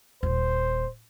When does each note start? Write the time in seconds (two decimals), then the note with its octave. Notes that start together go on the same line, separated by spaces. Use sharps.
0.23 D#1 D4 C5